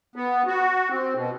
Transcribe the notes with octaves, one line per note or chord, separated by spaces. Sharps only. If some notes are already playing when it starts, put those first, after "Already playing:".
B3
F#4
C4
B2